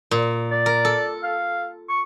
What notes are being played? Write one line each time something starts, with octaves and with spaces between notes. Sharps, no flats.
A#2
D5
A#4
A4
F5
C#6